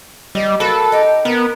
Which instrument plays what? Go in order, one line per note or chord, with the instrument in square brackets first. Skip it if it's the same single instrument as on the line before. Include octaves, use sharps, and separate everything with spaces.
[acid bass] G3 [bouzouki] D#5
[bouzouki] A#3 F#4 B4 [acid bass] A4
[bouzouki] D#4 G4
[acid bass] B3 [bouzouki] A#4